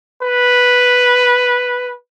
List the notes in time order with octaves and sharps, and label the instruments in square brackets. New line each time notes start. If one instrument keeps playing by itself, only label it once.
[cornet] B4